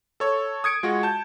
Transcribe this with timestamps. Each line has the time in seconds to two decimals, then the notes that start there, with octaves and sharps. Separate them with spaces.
0.20 A4 C#5
0.64 D#6 G#6 C#7 D7
0.83 G#3 F4 F#4
1.03 A5 G6